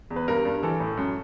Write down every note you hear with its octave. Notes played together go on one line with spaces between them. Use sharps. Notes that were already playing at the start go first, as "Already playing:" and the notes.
E2
B4
G2 A#4
G2
E3 A4
A2
F#2